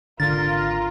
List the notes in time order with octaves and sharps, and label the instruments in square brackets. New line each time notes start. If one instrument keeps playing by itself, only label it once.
[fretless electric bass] G#1 D3 [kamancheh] F4 [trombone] A#4 [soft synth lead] A6